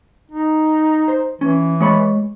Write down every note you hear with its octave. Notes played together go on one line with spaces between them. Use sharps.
D#4
C5
E3 C#4
G#3 C#5 B5